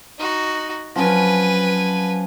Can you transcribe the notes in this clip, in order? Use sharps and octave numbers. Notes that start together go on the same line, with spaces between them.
D#4 F#4
F3 F#3 C#4 B4 D5 G#5